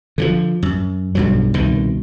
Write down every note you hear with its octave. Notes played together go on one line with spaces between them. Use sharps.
D3 D#3 F3
F#2
B1 G2 F#3
C2 B2 D#3